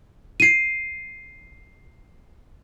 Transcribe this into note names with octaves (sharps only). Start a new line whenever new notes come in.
C7 D#7